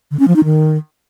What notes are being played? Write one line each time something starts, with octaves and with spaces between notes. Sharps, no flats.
D3
C#4
F3
D#4
D#3